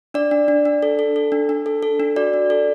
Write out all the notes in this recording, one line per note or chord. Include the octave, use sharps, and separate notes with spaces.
D4 D5
D4
D4
D4
A4
A4
A4
D4
D4
A4
A4
D4
F#4 D5
D4
A4